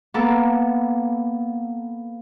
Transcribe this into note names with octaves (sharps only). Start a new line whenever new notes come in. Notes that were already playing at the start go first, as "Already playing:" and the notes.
A#3 B3 A4